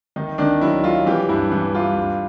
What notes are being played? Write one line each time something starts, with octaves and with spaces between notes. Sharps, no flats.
D#3 D#4
D#3 D4
F#3 E4
F#3 F4
E3 G4
G2 E4
E3
G3 F4
G2